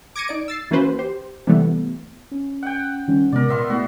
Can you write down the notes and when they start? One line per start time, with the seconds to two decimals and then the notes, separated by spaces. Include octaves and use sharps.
0.16 D6 G#6 A#6 C#7 D#7
0.28 D#4 D5 D7
0.48 E6 A6 C7
0.71 E3 A#3 C#4 F#4 B4 C5
0.99 G4 C5
1.47 C3 E3 G3 A3 B3
2.31 C#4
2.63 F#5 G5
3.08 D#3 G3 C#4
3.32 C3 G#3 B3 A#4 D5
3.49 A#2 B3 E5 C6
3.70 A3 B3 E4 F#4